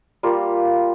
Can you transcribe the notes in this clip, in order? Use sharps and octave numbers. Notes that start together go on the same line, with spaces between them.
G3 A#3 F4 A#4